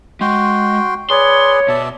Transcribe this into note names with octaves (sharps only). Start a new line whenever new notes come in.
G#3 F#4 G5 C6
G#4 B4 C#5 D5 C6
B2 D5 E5 A5